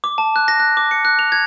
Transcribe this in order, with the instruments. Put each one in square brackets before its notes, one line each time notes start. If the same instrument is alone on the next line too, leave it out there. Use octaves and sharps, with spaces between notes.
[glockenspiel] D6
A5
F#6
A#6
F#6
D6
C#7
F#6
F7
G#6